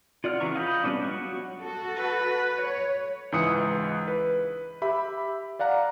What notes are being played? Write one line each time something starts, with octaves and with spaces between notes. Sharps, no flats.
F4 D5 F#5 F6
C#3 E3 B3 A#5 C#6
F4 D#5 G5 B5
G3 B3 C#4 D4
F#3 F#5 C#6
F#4 A4
B4
C#5
C#2 G#2 E3 D#6 C#7
B4
G4 E5 B5
D5 F5 F#5 A#5